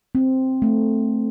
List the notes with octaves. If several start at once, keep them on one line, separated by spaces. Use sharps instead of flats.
C4
A3